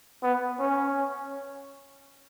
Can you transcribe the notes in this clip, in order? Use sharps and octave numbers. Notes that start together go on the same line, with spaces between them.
B3
C#4